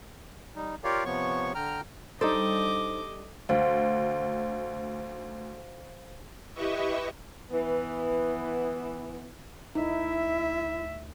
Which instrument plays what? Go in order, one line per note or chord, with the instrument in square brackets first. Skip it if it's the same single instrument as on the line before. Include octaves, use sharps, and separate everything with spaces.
[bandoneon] G3 D#4
F4 G4 A#4 C#5 D5 F5
C3 F3 B3 C#5 C#6
D3 G5 A#5 F6
[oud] G3 D4 [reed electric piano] D#4 C5 [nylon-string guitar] A4 [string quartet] D#5 D6
[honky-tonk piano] D2 [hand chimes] C5 F5
[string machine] E4 G4 B4 D#5 E5 C#6
[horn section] E3 B3
[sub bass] D2 [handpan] D#4 [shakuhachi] E4 [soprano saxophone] E5